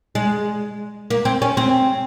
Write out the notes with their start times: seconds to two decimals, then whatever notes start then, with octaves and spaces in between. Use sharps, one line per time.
0.15 G#3
1.10 A#3
1.25 C4
1.42 C#4
1.57 C4